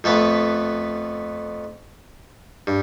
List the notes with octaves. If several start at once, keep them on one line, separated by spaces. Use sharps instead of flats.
F2 A3 B3 B4
G2